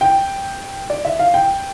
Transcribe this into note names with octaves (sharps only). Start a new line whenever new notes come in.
G5
D5
E5
F5
G5